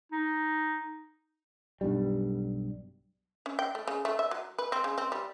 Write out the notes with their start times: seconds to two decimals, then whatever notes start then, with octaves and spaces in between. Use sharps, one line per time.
0.12 D#4
1.81 B1 G2 G3
3.46 C#4
3.59 G5
3.75 A3
3.87 C#3
4.05 A3
4.19 E5
4.31 F#3
4.58 B4
4.72 C4
4.84 C#3
4.98 C4
5.12 G3